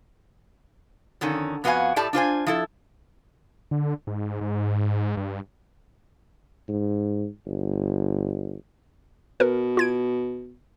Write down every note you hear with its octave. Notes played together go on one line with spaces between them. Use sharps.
F2 D3 D#3 C#4
F2 B3 F#4 B4 F5 G#5
A2 A3 G4 D5 A5
D4 F4 C5 G#5
F3 E4 A4
D3
G#2
G#2
G2
G#2
G1
B2 A#4 B4
F4 G#6 D7